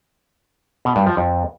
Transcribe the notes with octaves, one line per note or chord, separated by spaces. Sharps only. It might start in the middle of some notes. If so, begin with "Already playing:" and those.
B2
G2
F3
F2